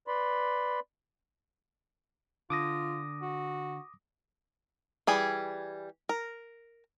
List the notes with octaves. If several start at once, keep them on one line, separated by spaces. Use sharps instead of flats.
B4 D5 B5 C6
D3 F4 D6 D#6 A#6
F#4
E3 G3 G#4
A#4